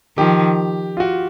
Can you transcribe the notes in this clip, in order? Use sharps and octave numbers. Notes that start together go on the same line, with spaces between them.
D#3 F3 G4
F4
F#4